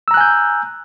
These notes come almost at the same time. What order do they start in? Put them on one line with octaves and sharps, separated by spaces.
E6 A#5 F#6 G#5 G6